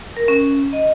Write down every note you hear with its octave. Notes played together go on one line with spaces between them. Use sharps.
A#4
C#4
D#5